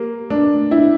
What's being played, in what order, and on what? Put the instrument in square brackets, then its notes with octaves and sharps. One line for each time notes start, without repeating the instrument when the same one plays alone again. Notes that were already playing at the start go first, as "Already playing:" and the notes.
Already playing: [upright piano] A#3 [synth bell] G4
[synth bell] A3 [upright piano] D4
[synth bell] D4 [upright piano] E4